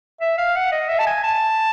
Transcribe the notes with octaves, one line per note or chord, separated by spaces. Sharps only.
E5
F5
F#5
D#5
E5
A5
G#5
A5